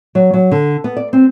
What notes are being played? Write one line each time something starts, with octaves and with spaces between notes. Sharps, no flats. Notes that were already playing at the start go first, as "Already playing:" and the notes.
F#3
F#3
D3
B3
D5
C4